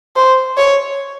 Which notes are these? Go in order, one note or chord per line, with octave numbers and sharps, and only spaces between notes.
C5
C#5